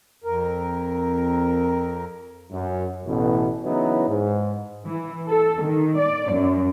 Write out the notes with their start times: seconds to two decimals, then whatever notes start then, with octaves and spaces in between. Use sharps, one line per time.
0.24 F2 A#4
2.52 F#2
3.06 A1 B2
3.64 C#3 E3 F#3 B3 D#4 E4
4.08 G#2
4.85 E3
5.28 A4
5.62 D#3
5.99 D5
6.31 F#2